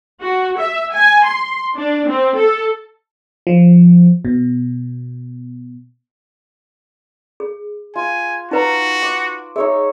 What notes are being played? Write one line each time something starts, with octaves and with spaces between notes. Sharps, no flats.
F#4
E5
G#5
C6
D4
C4
A4
F3
B2
G#4
F4 G#5
D#4 F#4 B4 A#5
D6
D#4 G#4 C#5 E5